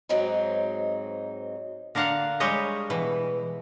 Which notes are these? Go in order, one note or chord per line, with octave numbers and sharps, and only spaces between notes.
D#2 G#2 F#3 G#3 C4 D#4
D3 A#4 D5 F5 F#5
G3 G#3 G4 C#5 D#5
B2 E3